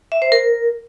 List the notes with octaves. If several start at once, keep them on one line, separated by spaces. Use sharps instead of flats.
E5
C5
A#4